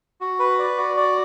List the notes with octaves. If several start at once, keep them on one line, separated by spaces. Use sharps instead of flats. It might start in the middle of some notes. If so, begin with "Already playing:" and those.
F#4
B4
D5
F#4
D5